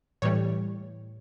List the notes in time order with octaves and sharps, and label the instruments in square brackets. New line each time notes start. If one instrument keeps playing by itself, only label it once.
[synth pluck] A2 E3 G3 C#5